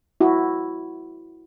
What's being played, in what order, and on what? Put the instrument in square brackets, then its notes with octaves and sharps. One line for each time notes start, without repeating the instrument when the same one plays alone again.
[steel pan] E4 F#4